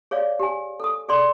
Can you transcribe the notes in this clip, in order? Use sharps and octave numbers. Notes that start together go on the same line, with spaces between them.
G#4 C#5 D5 F5
G4 G#5
A4 D#6
G#4 A4 D5 C6